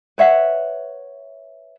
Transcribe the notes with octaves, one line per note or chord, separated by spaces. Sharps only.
B4 C#5 E5 F#5